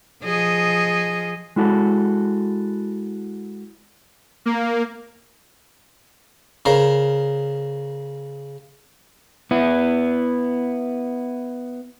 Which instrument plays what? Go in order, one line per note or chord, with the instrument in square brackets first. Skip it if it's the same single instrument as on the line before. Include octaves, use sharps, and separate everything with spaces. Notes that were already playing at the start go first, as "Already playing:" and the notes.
[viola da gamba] F3 G#4 D#5
[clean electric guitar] G#3 E4 F#4 A4
[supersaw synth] A#3
[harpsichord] C#3 A#4 C5
[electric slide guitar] B3 E4